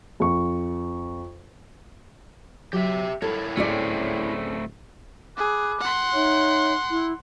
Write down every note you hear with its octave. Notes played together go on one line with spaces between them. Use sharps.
F2 C#6
F#3 G4 E5
E4 A4 A#4 C#5
D1 A3 C4 C#4 G#4 D5
G#4 B5 D6 F#6
F#5 C6
D#4 C#5 E5
E4